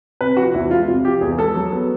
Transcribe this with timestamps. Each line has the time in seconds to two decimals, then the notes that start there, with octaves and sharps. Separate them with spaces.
0.21 C3 B4
0.37 F3 F#4
0.54 E2 E4
0.70 G#3 F4
0.88 C3 F4
1.05 F3 G4
1.21 E2 G#4
1.38 G#3 A4
1.55 F#3
1.72 B3